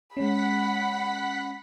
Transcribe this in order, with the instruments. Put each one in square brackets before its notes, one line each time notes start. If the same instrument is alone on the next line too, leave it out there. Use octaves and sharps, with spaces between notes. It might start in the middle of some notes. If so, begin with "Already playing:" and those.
[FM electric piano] G#3 C#4 [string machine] F#5 B6 [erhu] B5